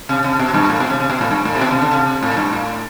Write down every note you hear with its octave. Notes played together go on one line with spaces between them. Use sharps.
C3
C3
B2
G2
A2
B2
C3
C3
B2
A2
G2
A2
C3
B2
C3
D3
C3
A2
G2
A2